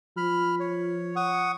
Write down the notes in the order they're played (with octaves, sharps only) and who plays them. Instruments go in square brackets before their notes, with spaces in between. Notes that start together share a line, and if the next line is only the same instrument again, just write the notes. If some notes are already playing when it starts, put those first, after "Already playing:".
[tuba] F3 [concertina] B5 F6
[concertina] C#5
F#5 C#6 D#6